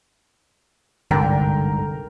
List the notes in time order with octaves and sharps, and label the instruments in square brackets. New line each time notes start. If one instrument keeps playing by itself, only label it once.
[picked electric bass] G1 C2 G#2 [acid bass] D3 [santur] A#4 G5